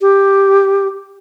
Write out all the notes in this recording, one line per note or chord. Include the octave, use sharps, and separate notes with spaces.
G4